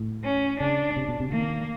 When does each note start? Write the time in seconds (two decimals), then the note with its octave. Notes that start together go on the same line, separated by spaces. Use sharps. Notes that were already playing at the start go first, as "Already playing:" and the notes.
Already playing: A2
0.24 C#4
0.60 C#3 D4
0.97 C3
1.09 B2
1.20 C3
1.31 D#3 A#3